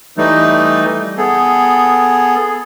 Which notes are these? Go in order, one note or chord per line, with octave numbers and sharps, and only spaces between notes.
E3 G3 A3 D#4
B3 G#4 A4